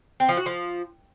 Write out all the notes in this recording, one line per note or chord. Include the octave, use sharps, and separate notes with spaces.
C4
F3
F#4
F3